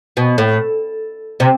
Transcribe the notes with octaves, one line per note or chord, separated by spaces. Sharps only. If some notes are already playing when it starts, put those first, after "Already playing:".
B2
A2
C3